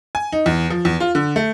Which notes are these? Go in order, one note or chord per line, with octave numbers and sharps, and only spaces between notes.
G#5
D#4
E2
F3
E2
F4
D3
A3